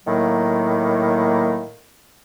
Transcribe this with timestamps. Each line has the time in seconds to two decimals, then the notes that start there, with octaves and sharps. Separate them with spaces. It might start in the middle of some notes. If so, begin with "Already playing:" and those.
0.06 A2 D#3 F#3 A#3